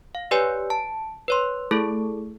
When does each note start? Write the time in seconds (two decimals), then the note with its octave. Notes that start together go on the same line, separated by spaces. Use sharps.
0.15 F5
0.31 G4 B4 C#5 D5 G#5
0.70 A5
1.28 B4 C#5 C6
1.71 A3 E4 G#4 A4